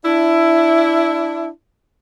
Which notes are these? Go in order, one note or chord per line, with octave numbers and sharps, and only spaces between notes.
D4 E4